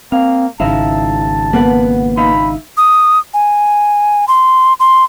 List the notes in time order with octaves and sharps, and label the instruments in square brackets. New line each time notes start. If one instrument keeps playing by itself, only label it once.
[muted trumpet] A#3 [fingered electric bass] C4 [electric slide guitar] F5
[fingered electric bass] G#1 C#3 [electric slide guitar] D#4 E5 F5 [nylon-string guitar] E4 [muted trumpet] A5
[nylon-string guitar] A#3 B3 [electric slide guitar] B4 F#5
[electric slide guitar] D#4 E5 F5 [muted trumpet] B5
[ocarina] D#6
G#5
C6
C6